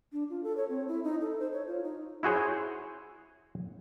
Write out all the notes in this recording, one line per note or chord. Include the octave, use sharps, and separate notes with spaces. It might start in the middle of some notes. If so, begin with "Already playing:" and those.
D4
F4
A4
C#5
C4
E4
D#4
A4
C5
C#5
F4
D#4
E4 F#4 G#4 C5 C#5